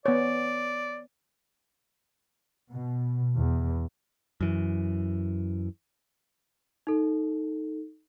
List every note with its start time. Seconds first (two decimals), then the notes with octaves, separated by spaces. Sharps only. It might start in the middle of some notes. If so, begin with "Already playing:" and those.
0.06 B3 C#5 D5
2.72 B2
3.37 E2
4.41 F#2 E3
6.87 D#4 A4